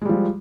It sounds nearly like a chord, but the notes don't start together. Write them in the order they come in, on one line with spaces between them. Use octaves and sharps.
G#3 G3 F3